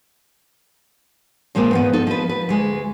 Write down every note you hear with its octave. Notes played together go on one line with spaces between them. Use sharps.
A#2 F3 G#3 A#3 C4
E2 G#2 B3
D#4 A4
F3 B4
B4
D2 G#3